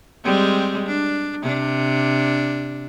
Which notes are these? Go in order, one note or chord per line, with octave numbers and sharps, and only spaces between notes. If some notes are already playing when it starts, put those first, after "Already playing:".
G3 G#3 C4
D4
C3 D4